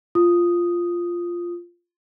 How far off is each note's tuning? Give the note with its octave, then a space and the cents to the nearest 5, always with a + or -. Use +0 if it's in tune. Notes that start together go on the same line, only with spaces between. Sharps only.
F4 -5 D#6 +0